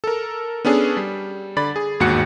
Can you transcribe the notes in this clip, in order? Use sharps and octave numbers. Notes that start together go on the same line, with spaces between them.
A4 A#4
B3 C#4 D4 G#4 A4
G3
D3 D5 B5 A6
G#4
G1 D#2 G#2 F#4 F#6 C#7